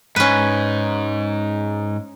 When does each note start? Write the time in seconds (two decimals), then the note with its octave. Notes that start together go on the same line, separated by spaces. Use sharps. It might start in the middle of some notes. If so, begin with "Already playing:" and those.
0.16 G#2 C#4 B4